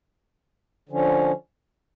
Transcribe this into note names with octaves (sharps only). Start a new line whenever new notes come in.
D3 F3 C#4